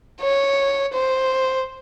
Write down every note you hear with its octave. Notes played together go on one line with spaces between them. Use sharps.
C#5
C5